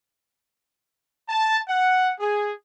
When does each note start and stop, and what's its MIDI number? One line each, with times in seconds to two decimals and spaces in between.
1.29 1.59 81
1.68 2.09 78
2.20 2.52 68